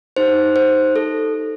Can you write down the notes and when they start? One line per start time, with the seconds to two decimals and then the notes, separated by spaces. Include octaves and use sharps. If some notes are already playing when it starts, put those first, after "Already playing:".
0.17 D#4 G4 C5
0.56 C5
0.96 A4